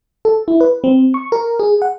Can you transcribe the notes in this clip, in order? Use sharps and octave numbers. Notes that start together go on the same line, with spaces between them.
A4
E4
B4
C4
C#6
A#4
G#4
F#5